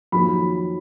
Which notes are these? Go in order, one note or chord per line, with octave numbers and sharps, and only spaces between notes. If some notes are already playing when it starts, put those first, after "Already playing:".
F2 D#3 F#3 A#3 B5